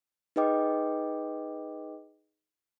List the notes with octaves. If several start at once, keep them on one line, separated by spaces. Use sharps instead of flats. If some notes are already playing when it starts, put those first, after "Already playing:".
D#4 G#4 B4 D#5 G5 D6